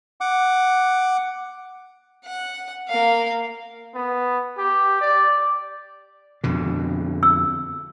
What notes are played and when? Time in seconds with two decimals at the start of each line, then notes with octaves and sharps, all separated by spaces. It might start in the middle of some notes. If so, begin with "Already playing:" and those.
0.21 F#5 D6
2.25 F#5
2.88 A#3 F5
3.94 B3
4.58 G4
5.01 D5
6.44 F2 B2 D3
7.23 E6